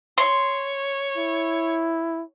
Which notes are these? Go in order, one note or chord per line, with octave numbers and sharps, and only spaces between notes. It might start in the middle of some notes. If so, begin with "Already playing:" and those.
C#5 C6
E4